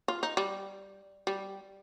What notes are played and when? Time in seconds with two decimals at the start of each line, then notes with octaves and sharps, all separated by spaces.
0.08 F4
0.23 D#4
0.37 G3
1.27 G3